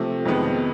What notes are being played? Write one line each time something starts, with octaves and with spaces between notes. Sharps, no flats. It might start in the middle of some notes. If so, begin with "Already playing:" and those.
Already playing: C3 F3 A3
F2 C3 D#3 G#3 B3